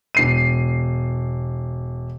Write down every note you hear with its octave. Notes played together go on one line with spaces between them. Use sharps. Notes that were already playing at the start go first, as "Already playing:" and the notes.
E1 C7 D#7